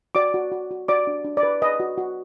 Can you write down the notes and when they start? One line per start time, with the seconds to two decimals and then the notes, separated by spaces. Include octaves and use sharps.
0.15 F#4 D5 D6
0.34 F#4
0.52 F#4
0.71 F#4
0.88 F#4 D5 D6
1.07 D4
1.24 D4
1.37 D5
1.43 B4
1.62 B4 D#5
1.80 F#4
1.98 F#4